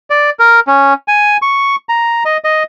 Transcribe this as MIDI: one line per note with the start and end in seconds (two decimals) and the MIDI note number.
0.10 0.30 74
0.39 0.60 70
0.67 0.94 61
1.08 1.37 80
1.42 1.76 85
1.89 2.23 82
2.25 2.37 75
2.44 2.63 75